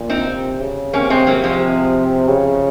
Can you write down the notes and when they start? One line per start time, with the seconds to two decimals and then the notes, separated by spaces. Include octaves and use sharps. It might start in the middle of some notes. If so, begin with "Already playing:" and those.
Already playing: A#2
0.09 C4 D#4
0.26 C3
0.60 C#3
0.93 C3 A#3 C#4
1.10 G#3 C4
1.27 F#3 A#3
1.44 F3 G#3
1.60 C3
2.28 C#3